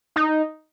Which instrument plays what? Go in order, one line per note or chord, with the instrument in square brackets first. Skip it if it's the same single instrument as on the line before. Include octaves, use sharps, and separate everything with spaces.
[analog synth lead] D#4